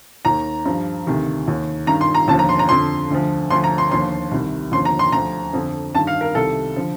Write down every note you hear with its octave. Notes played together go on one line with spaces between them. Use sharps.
D#2 D#3 A#5
G2 F3
D2 C3 D#3
D#2 D#3
G2 D#3 A#5
C6
A#5
D#2 D3 F3 A5
A#5
C6
A#5
F2 D3 F3 C6
D2 D3 F3
D2 D3 F3 C6
A#5
C6
D#2 D3 F3 C6
C2 C3 D#3
D#2 D3 F3 C6
A#5
C6
D2 D3 F3 A#5
F2 D3 F3
G2 D#3 A5
F5
A#4
C2 C3 D#3 A4
D3 F3